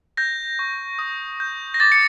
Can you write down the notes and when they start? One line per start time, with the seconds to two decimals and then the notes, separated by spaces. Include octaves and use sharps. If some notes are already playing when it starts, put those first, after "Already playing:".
0.17 G6 A#6
0.59 C#6
0.99 D#6
1.40 G6
1.74 A#6
1.80 D6 A6
1.92 C#7